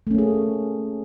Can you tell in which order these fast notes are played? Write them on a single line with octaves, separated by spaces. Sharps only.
A3 C#4 A#3 G#4